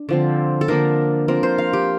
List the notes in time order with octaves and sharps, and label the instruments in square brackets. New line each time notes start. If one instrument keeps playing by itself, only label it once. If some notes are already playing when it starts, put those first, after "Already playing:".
Already playing: [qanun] D4
D3 F3 C4
A4
D3 F3 A#3 D4 A#4
F3 C4 A#4
C5
F5
G4